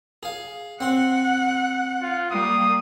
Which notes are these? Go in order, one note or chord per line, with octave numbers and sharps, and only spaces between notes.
G#4 F5
C4 F#5 C6
F4
G3 A#3 D#6